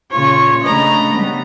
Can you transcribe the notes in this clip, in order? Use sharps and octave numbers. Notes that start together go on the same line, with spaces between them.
A#2 C#3 F4 C#5
C#3 A3 D4 D#5 A#5 B5
G3 B3